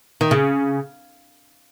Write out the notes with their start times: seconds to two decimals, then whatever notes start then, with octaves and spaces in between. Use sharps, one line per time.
0.21 D#3
0.31 C#3